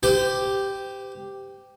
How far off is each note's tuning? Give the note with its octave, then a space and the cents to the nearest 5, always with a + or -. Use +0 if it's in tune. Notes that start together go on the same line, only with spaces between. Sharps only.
G4 +0 C5 -40